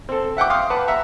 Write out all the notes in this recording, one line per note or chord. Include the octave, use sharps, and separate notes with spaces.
C4 A4
E5 F#5 G5 D6
F5 G5 C6 D6 D#6
B4 F#5 A5
E5 F#5 A#5